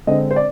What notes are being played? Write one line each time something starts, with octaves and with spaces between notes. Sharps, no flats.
D3 G#3 C4 D#5
C5
D5